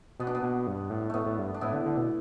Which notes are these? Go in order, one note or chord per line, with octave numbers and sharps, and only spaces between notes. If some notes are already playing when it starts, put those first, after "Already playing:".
B2 B3
D4
B3
B2
G2
A2
A2 A3 B3
A2
G2
D4
A2 B3 E4
D3
D3
B2